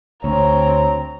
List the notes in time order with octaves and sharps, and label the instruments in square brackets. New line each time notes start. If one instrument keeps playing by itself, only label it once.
[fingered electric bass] D2 [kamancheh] C4 A#5 [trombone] C#5